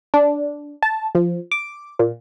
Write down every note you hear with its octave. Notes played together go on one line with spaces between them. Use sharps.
D4
A5
F3
D6
A#2